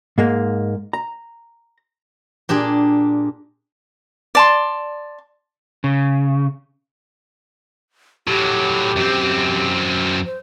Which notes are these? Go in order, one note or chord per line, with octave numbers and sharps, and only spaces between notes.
G#2 G#3 A#3
A#5
A#2 D4 G4 G#4
D5 A5 C6
C#3
A2 F#3 G4
F#2 C4
C5